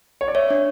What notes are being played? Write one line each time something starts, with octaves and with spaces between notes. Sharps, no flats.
C#5
D5
C#5 E5
D4